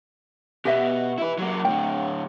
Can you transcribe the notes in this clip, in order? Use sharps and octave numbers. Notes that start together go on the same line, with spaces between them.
B2 B3 G4 D#5 E5
E4 B4
F#3 A#3
A2 D3 G5